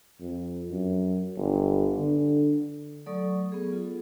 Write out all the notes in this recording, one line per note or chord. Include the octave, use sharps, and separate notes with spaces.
F2
F#2
G1
D3
F#3 A3 A4 D5 C#6 D#6
F#3 B3 G#4
F4 A4